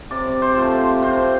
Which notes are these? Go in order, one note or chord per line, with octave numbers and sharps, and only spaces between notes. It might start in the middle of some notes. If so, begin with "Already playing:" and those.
C3 D5
C5
F3 A3
C3 C5